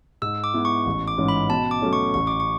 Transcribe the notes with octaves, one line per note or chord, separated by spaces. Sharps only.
G#2 E6
D6
G#3 B3 E4
C#6
A1
D6
G#2 E3 G#3 C#4
B5
B2 A5
D6
F#3 A3 C#4
C#6
A1 C#6
D6
C#6